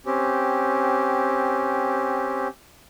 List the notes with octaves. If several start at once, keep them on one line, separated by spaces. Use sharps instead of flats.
C4 C#4 G4